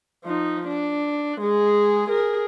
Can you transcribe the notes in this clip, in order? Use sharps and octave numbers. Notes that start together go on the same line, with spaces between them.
F3 D#4
D4
G#3 G#4
G#4 A#4